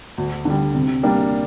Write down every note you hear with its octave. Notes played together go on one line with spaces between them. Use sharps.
D2
D3 G3
C3
G3 A#3 D4